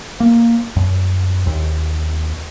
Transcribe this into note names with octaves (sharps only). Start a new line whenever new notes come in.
A#3
F#2
D#2